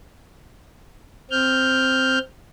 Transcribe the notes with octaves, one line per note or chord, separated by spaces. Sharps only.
C4 F6 G6